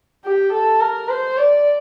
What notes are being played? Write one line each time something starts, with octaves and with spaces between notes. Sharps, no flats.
G4
A4
A#4
C5
D5